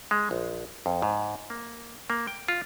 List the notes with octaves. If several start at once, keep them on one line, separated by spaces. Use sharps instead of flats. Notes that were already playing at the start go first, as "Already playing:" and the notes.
G#3
A#1
F2
G#2
A#3
A#3
G5
F4